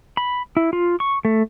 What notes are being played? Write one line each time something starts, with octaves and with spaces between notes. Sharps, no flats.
B5
E4
F4
C#6
A3